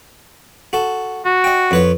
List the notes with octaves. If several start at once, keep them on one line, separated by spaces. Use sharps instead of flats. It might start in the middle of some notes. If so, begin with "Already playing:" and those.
F#4 A4
F#4
D#5 G5
F2 B4 C#5